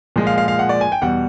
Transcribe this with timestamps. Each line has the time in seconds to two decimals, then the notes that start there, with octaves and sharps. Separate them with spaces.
0.16 A#2 F3 G#3
0.27 F5
0.38 F5
0.48 F5
0.59 F#5
0.69 D5
0.81 G#5
0.92 G5
1.02 E2 B2 G3 F#5